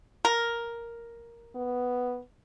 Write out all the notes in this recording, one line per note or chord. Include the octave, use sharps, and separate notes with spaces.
A#4
B3